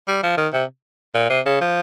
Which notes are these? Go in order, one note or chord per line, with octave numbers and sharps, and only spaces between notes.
G3
F3
D#3
C3
A#2
C3
C#3
F3